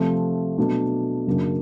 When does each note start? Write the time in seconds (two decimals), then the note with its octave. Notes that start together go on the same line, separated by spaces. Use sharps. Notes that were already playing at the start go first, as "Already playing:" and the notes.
Already playing: C3 F3 A3
0.58 B2 F#3 A3 D4
1.27 F#2 C#3 F#3 A#3 D4